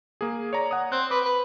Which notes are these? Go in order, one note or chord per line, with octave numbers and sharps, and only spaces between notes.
A#3 G#4
C#5 D5 A#5
F#5 D#6
C4 F#6
B4 D6
B4